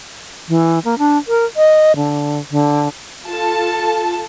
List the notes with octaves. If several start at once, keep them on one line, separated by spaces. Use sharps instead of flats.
E3
A#3
D4
A#4
D#5
D3
D3
F4 A4 A5